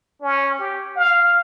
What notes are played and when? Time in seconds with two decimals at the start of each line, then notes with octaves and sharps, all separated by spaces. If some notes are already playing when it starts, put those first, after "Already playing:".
0.22 C#4
0.59 G4
0.96 F5